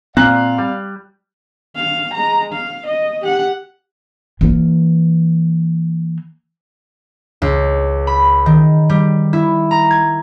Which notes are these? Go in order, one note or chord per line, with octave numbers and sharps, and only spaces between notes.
A#2 C4 D5 F5 F#6
G3
F5
G#3 A#5
F5
D#5
G4 F#5
E3 A#3
C#2
B5
D#3
G3
E4
A#5
G#6